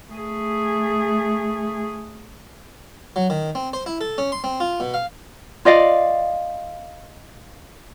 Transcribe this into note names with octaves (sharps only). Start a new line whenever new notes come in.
A3 G#4
F#3
D#3
C4
C5
E4
A4
C#4
C6
C4
F4
B2
F5
F4 D5 D#5 F5